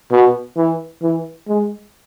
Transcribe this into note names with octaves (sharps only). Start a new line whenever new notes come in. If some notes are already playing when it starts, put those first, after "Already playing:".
B2
E3
E3
G#3